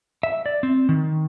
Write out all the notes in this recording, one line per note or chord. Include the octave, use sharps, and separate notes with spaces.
E5
D5
C4
D#3